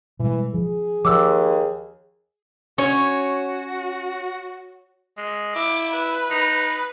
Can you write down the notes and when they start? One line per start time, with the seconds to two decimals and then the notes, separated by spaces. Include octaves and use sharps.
0.19 B2 E3 G3 G#3
0.54 F3 G#4
1.05 D#2 F3 D6 E6
2.78 C#4 F#4 C#5
5.17 G#3
5.55 E4 D6
5.91 B4
6.31 D#4